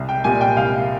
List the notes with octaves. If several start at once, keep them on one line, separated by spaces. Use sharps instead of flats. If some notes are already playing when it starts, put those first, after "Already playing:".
Already playing: C2
G5
A#2 G3 G#5
G5
C2 F5